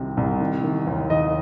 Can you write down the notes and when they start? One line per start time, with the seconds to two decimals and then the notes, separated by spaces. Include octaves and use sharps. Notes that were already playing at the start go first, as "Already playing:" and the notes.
Already playing: C2 C3 D#3
0.17 C2
0.40 D#3
0.64 D#3
0.87 D#2
1.10 D#2 D#5